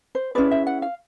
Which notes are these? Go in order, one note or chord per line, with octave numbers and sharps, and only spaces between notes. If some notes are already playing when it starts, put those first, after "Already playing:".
C5
C#4 E4 G#4 B4 D5
E5
F#5
F5